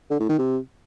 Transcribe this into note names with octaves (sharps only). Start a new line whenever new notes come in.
D3
A2
D#3
C3